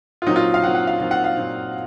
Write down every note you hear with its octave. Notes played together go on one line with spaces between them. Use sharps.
F4
A#2 F#3 C4 D#4
F4
F5
A#2 F#3 C4 F#5
F#5
F5
A#2 F#3 C4
F#5
F5
A#2 F#3 C4